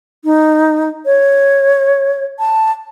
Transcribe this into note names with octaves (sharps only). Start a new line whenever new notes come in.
D#4
C#5
A5